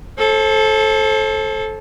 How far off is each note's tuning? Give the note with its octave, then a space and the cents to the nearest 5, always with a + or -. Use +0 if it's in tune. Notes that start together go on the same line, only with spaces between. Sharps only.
A4 -15 C5 +35